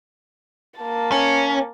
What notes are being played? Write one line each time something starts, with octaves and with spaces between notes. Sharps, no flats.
A#3 A5
C#4